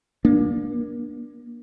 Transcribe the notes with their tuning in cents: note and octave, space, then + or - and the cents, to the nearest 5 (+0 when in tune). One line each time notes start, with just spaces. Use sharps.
A#3 +30 D4 +0